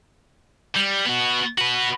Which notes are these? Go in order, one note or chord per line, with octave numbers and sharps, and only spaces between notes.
G3
B3 F#4
F#4 B4